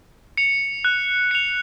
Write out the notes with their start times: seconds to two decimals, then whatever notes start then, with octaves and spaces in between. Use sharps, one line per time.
0.37 C#7 F7
0.85 F#6
1.31 C#7 F7